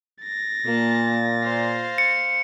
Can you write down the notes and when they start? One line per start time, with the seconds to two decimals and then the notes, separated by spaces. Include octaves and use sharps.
0.23 A6 A#6
0.65 A#2 A#3 A5
1.43 C5 F5
1.98 C#7